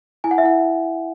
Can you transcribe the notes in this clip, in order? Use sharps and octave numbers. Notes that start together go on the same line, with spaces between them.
E4 G#5
F#5
E5
E4 F#5